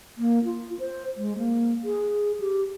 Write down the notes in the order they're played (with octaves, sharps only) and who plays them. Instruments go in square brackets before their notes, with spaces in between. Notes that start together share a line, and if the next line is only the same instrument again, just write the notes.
[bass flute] A#3
F4
C5
G#3
A#3
G#4
G4